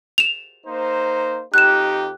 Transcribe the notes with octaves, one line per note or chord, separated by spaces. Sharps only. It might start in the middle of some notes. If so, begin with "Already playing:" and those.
E7 F7
A#3 D#4 C5
F2 D#4 G4 F#6 E7